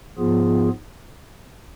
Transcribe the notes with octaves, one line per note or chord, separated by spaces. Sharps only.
G#2 F3 B3 F4 G#4